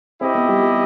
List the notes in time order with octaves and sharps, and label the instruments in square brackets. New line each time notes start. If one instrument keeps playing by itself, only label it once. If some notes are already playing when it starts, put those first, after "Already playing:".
[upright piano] C4 [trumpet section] E4 G4 D#5
[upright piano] B3
G3
G3